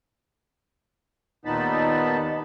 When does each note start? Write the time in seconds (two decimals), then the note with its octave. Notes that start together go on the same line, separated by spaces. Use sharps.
1.45 D#2 A#2 B3 D#4 A5 B5